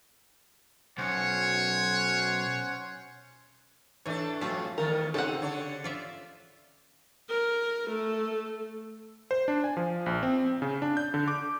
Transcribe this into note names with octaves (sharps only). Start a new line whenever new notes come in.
B1 C#4 C5 C#5 F#5
E3 A3 D4 A4 C#5
F2 G3 A3 F4 F#4 A4
E2 D#3 A3 A#4
C#3 C4 D#4 G4 A4 F#5
D3 D4 C#5
F4 D5 E5
A#4
A3
C5
D4
G#5
F3
A#1
C4
C#3
D4
G6
D3
D6